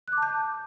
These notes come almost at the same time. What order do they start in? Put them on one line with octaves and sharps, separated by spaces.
F#6 D6 A5 G6